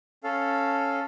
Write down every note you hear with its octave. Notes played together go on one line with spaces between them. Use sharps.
C#4 A4 F5